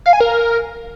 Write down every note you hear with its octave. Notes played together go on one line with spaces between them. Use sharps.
F5
G#5
A#4